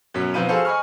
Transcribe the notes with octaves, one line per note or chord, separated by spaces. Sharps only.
F#2 B2 F#3 B6
B1 F3 C4 F4 B4 D#7
F#4 G#4 A4 C5 F5
D#5 G#5 B5 C#6 F6